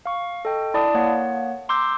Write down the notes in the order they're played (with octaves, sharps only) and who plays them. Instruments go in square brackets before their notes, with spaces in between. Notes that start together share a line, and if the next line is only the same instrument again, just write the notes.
[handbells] F5 C#6
A4 D#5 G5
E4 D5 A5 D#6
A#3 C#5 F#5
A#5 C6 D6 E6 G6